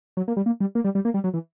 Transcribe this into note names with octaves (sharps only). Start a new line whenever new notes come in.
F#3
A#3
G3
A#3
G3
A#3
G3
G3
A#3
G3
F#3
E3